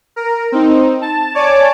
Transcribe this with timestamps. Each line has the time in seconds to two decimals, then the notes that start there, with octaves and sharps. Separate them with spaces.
0.16 A#4
0.52 C4 D#4
1.01 A5
1.35 C#5 D5 G#5 A5 D6